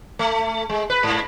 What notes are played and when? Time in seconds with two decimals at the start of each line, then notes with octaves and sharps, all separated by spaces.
0.19 A3
0.69 G#3
0.90 B4
1.03 G#2